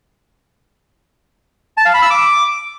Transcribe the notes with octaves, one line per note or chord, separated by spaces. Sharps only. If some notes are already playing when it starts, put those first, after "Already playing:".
A5
F5
B5
E6
D6